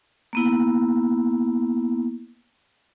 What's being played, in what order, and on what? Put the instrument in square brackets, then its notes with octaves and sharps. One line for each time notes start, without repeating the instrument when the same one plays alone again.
[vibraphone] A#3 B3 E4